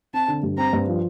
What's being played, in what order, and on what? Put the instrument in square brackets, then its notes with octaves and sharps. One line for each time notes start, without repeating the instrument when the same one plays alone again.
[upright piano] C4 [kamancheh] A5
[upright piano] D3
G2
[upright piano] C4 [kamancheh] A#5
[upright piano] G2
F3